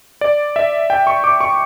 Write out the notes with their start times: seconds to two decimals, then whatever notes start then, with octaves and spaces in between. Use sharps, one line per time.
0.21 D5
0.56 E5
0.90 G5
1.07 C#6
1.24 D6
1.41 C#6